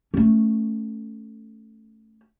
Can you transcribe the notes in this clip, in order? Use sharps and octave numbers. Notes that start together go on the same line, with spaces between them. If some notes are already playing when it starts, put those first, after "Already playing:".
A3 C#4